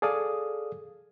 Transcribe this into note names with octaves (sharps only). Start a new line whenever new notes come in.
G#4 A4 D5 F5 D#6